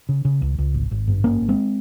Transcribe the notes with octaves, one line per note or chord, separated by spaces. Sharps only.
C#3
C#3
C#2
C#2
G#1
G#1
G2
G#1 A#3 C#4
G#1
G#3 C4